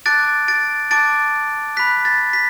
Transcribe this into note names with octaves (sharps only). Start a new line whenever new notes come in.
A5 D6 F#6 A6 D7
A6 D7
A5 D6 F#6 A6 D7
B5 F#6 B6
A6
B6